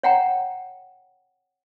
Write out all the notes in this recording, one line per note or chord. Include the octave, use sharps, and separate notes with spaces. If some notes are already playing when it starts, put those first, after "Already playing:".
C#5 F#5 G5 A#5